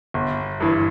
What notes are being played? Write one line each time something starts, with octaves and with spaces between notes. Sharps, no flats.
G1
G2 E3